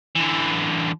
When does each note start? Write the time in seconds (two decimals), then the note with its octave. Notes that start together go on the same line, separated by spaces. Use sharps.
0.15 D3 E3